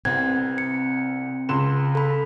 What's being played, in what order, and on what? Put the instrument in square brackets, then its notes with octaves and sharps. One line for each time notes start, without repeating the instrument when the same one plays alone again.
[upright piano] C2 [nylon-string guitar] C3 B3 C4 [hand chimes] G#6
[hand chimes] C#7
[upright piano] C#2 C6 E7
[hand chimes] A4 B5